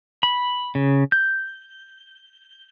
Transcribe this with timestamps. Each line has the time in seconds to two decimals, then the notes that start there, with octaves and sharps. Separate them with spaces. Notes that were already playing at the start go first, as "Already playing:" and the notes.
0.23 B5
0.75 C#3
1.12 G6